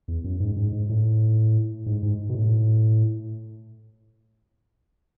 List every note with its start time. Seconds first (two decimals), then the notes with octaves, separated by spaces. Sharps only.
0.08 E2
0.24 F#2
0.40 G#2
0.56 G#2
0.72 G#2
0.89 A2
1.86 G#2
2.03 G#2
2.29 B2
2.35 A2